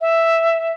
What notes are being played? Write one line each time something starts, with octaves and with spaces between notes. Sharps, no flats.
E5